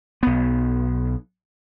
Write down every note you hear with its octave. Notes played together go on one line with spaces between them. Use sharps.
B1 B3